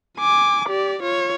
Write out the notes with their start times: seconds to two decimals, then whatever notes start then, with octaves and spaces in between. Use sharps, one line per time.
0.19 G#5 D6
0.69 G4 D5
1.03 F4 C#5